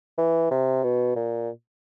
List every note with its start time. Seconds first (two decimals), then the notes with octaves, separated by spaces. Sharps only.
0.18 E3
0.51 C3
0.84 B2
1.16 A#2